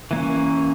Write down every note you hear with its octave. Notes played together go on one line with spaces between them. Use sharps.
E3 A#3 C#4